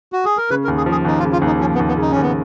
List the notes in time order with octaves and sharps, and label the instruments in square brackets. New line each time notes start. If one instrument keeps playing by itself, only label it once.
[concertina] F#4
G#4
A#4
[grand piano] C#3 [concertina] B4
[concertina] A#4
[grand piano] D#2
[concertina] G#4
[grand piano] F3
[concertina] G#4
[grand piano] D#2 [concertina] D#4
[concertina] F4
[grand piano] C#3
[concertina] F4
[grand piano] D#2
[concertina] D#4
[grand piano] F3 [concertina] C#4
[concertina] B3
[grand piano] D#2
[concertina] B3
[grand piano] C#3 [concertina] D#4
[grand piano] D#2 [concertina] C#4
[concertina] B3